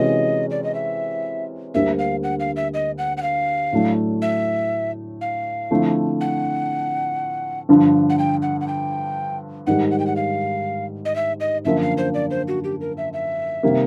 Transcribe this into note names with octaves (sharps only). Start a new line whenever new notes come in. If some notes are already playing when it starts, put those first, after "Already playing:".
Already playing: C3 E3 G#3 C#4 F#4 D#5
D5
D#5
E5
D2 D3 G3 A#3 E5
F5
F#5
F5
E5
D#5
F#5
F#5
F5
A2 F#3 A3 D4
E5
F5
D3 F3 A3 C4 E4
F#5
G2 D3 F3
F#5
G5
F#5
F#5
G5
G#2 D#3 G3 F#5
F#5
G5
F#5
F5
D#5
E5
D#5
F#2 D3 F3 A#3 E5
F5
C5
D5
C5
F#4
G4
A#4
E5
E5
C3 D#3 G3 A#3